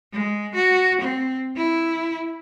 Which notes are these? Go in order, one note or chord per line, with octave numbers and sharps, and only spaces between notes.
G#3
F#4
C4
E4